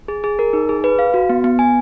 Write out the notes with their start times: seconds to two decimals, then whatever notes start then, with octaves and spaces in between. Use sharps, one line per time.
0.08 G#4
0.24 G#4
0.39 A#4
0.53 D#4
0.69 G#4
0.84 B4
0.99 F5
1.14 F#4
1.29 B3
1.44 B3
1.59 G#5